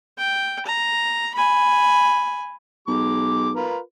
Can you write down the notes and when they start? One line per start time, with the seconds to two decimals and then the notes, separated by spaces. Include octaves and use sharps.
0.18 G5
0.66 A#5
1.35 G#5 B5
2.88 B1 G#3 D6
3.56 F4 A#4 B4